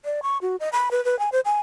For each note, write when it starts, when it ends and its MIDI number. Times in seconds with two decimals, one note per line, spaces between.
0.05 0.20 74
0.23 0.38 85
0.42 0.56 66
0.60 0.69 75
0.72 0.89 83
0.91 1.03 71
1.05 1.19 71
1.19 1.30 80
1.32 1.40 72
1.45 1.60 80